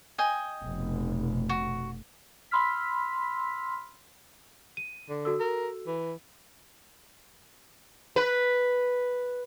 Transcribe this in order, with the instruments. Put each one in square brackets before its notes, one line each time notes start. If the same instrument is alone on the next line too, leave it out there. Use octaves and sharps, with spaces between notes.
[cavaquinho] D#5 G5 G#5
[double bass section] F1 B2
[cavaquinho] F#4
[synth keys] B5 C6 E6 F6 B6
[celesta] D#7
[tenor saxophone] D3
[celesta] F#4 A4 E6
[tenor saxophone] A#4
E3
[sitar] B4